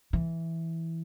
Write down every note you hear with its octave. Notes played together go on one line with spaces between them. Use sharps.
E3